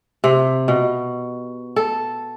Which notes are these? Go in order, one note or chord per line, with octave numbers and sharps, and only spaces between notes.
C3
B2
A4